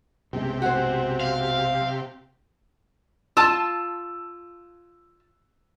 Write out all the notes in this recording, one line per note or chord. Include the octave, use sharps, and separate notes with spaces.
B1 F#2 C3 G#3 G4
F#4 G#4 C5
F5
F4 A5 E6